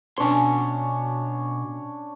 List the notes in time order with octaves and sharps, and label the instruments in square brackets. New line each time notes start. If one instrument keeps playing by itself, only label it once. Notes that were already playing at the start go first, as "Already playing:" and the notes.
[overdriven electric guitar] B2 C6 [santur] C#4 D4 C#5